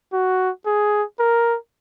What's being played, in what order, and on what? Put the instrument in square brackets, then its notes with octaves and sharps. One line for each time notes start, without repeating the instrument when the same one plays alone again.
[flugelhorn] F#4
G#4
A#4